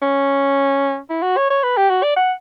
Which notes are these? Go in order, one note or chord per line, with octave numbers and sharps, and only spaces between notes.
C#4
E4
F#4
C#5
C#5
B4
G4
F#4
D5
F#5